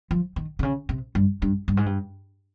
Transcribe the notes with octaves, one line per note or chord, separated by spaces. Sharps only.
F3
D#3
C3
C#3
C3
G2
G2
G2
G#2
G2